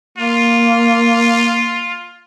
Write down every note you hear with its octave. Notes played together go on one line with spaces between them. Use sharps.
A#3 F4